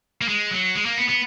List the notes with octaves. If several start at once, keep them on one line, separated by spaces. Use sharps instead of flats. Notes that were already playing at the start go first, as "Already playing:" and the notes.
A#3
G#3
F#3
G#3
A#3
B3
B3